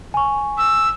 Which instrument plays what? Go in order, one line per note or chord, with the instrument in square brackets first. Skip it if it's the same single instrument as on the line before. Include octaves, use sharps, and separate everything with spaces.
[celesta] G#5 C#6
[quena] E6